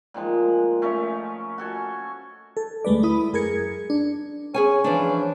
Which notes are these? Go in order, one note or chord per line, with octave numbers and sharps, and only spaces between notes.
A#2 D#3 F3 G#3
A3 C#4 A#4 D#5
F#4 A4 G#5
A4
D2 G#3 A3 B4 D5
E4 B5 D#6
F#2 G#4 A#4 G#6 C#7
D4
C#4 G#4 C#5 G#5
E3 F3 D4